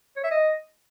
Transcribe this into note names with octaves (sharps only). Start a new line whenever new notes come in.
C#5
E5
D#5